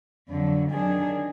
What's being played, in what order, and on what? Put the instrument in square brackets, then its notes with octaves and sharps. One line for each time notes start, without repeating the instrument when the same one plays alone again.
[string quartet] F2 D3 F#3
D#3 F#3 D4 G#4